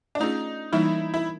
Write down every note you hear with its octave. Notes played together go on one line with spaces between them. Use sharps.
D4
A3 C#4 D#4 F4 G#4
E3 G3 A#3 D#4 E4
E4